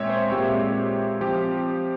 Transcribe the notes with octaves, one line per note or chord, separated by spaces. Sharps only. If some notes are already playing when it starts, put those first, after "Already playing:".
Already playing: A#2 G#3 C4 C#5 E5
C5
A#2 G#3 C4 G4
F3 C4 G4